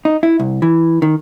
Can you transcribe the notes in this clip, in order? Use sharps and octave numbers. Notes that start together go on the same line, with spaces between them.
D#4
E4
C2
E3
D#3